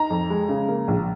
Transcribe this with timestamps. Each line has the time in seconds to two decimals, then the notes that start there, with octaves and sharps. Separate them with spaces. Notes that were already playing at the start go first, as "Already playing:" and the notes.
Already playing: D#4 A#5
0.10 F2
0.30 G#3
0.49 C#3
0.68 A#3
0.88 A#1